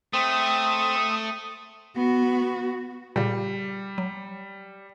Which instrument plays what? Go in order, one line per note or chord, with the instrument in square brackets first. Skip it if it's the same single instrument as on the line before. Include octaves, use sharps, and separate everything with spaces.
[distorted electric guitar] A3 [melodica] C4 [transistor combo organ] D#6
[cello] B3 F#4
[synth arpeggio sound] A#2 C#3 [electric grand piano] G3
[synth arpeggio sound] F#3